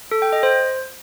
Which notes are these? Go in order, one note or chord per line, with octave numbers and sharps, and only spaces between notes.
A4
G5
D#5
C5